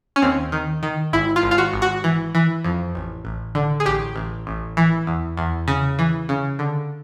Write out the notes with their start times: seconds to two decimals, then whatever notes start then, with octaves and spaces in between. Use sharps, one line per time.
0.16 C#4
0.22 D#2 C4
0.52 D#3
0.83 D#3
1.13 G#1 E4
1.36 F4
1.43 G#1
1.51 F4
1.58 F#4
1.73 G#1
1.82 F#4
2.04 E3
2.35 E3
2.64 F2
2.95 A1
3.25 A1
3.55 D3
3.80 G#4
3.86 A1 G4
4.16 A1
4.47 A1
4.77 E3
5.07 E2
5.37 E2
5.68 C#3
5.99 E3
6.29 C#3
6.59 D3